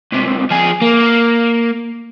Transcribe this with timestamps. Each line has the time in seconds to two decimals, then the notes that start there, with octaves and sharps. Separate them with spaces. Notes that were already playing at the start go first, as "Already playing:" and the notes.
0.12 C#2 C3
0.51 F3 G#4
0.82 A#3